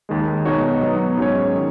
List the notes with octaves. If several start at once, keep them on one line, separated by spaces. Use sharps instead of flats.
D#2 D#3 G#3
B2 G#3 D#4 F#4 C#5
F#3 B3 D#4
G#2 F#3 C#4 G#4 C#5
D#3